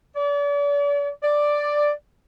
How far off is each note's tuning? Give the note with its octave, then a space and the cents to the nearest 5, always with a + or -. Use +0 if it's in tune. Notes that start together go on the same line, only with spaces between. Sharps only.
D5 -40
D5 +5